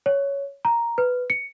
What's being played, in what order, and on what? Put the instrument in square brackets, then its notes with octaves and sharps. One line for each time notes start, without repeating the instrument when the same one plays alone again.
[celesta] C#5
A#5
B4
C#7